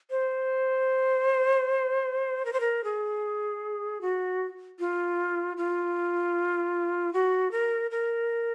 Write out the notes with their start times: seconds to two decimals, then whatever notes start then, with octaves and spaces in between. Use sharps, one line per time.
0.11 C5
2.45 A#4
2.53 C5
2.60 A#4
2.84 G#4
4.01 F#4
4.79 F4
5.57 F4
7.13 F#4
7.51 A#4
7.91 A#4